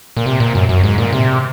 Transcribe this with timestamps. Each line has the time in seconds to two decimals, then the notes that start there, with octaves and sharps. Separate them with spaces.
0.17 A#2
0.26 C3
0.40 A#2
0.55 F#2
0.69 F#2
0.84 G#2
0.98 A#2
1.13 C3